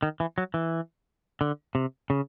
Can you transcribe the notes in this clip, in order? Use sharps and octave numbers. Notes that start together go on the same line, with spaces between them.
D#3
E3
F#3
E3
D3
C3
C#3